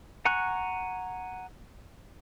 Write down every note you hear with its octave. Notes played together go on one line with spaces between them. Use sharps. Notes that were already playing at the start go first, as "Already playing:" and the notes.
F#5 G#5 A#5 C#6 F#6